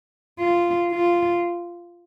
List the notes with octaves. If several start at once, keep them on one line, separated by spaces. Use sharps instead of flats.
F4
F4